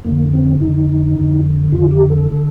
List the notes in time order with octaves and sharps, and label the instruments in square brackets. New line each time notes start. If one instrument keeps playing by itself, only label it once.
[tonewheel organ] F2 D3 A#3
C4
F2 D3 D#4
F2 D3
F2 D3 F4
G4
A4
D3